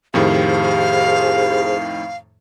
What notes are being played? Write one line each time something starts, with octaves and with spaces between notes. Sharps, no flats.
F2 A2 D#3 G4 G#4 C5 F5